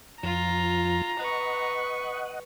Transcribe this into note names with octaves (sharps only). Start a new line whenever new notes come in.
F2 F3 F4 A#5
B4 D#5 F#5 C#6